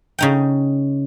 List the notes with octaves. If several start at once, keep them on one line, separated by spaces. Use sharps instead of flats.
C#3 D#4 G5